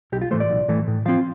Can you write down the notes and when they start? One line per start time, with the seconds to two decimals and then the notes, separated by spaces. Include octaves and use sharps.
0.12 B1 G4
0.22 F4
0.31 A2 E3 A3 C5
0.40 D5
0.50 B1
0.68 A2 E3 A3
0.88 A2
1.06 F3 C4 F4 F5